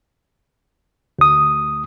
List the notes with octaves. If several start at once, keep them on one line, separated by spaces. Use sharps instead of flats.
D2 D#6